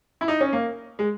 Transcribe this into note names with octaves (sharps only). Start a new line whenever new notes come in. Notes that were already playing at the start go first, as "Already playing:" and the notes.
E4
D#4
C#4
A#3
G#3